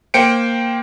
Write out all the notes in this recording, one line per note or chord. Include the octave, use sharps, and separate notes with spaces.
A#3 C5 G5 C#7 D7